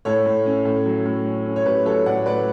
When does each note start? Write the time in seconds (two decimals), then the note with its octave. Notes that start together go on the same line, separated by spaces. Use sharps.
0.05 A2 A4 C#5
0.26 A2
0.46 C#4
0.65 A2
0.86 F#3
1.05 A2
1.26 C#4
1.45 C#4
1.56 C#5
1.66 A2 G4 B4
1.85 F#3 A4 C#5
2.06 A2 D5 F#5
2.26 A2 B4 D5